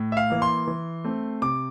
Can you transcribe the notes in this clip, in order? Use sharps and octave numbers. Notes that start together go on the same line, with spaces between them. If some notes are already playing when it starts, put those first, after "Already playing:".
Already playing: A2
E5
F5
E3 A#3
C6
E3
A3 C4
C3 D6